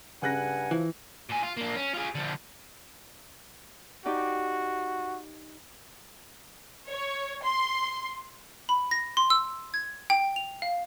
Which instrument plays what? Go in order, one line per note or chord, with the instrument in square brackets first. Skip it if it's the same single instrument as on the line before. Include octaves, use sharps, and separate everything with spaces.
[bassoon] G2 [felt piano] C#3 F#6 A#6 [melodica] F#5 G#5
[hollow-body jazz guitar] E3 [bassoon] F3
[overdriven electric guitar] A#2 G#5
F4
A#3 D4
C#4
F4 G#4
D3 F3
[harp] D#4 G4 D5 [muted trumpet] F#4
[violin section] C#5
C6
[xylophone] B5
A#6
C6
E6
G#6
G5
F7
F5